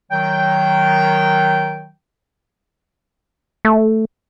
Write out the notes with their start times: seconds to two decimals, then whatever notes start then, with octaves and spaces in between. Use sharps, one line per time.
0.11 D#3 F#3 G5
3.65 A3